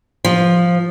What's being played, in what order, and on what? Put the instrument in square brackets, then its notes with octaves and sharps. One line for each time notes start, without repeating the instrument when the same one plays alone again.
[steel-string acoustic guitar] F3